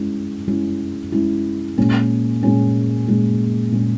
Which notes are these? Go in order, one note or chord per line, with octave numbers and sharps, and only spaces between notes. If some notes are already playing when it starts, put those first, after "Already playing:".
Already playing: G#3 C#4 E4
G#3 C#4 E4
G#3 C#4 E4
A#2 G#3 C#4
A#2 G#3 C#4
A#2 G#3 C#4
A#2 G#3 C#4